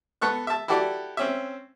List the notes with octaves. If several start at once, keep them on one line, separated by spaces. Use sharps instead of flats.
B3 A4 C#6 F#6
E5 A5
E4 F#4 G4 A4 D5
C4 C#4 E5